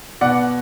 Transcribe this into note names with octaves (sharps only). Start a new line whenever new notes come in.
B2 D5 F#5